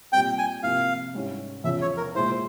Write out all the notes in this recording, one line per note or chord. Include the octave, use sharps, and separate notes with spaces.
A#2 G3 C4 G5
G#5
C3 F3 A#3 E4 F5
G#2 G3 C#4 E4
E2 C#3 F3 E5
C#5
A#4
A#2 G#3 E4 C5